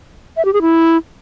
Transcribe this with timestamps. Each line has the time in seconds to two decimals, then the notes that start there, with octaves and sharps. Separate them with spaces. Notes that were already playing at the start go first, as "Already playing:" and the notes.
0.37 E5
0.45 G4
0.53 G#4
0.62 E4